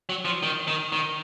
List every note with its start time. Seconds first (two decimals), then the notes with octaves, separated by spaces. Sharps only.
0.09 F#3
0.25 F3
0.42 D#3
0.67 D#3
0.92 D#3